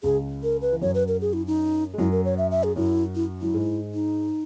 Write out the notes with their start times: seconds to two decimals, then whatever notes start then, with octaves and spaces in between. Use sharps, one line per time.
0.03 C#2 C#3 G#4
0.43 A#4
0.61 B4
0.72 E3
0.81 F#2 F#3 C#5
0.95 B4
1.08 A#4
1.21 G#4
1.33 E4
1.47 D#4
1.94 G#3
1.98 F#2 F#3 E4
2.12 A#4
2.25 C#5
2.38 E5
2.51 E5
2.63 G#4
2.76 F#2 F#3 E4
3.15 E4
3.41 F#3 E4
3.54 G#2 G#3
3.94 D#4